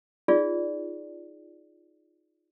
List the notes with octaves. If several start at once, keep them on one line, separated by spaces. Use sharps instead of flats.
D#4 F4 G#4 D5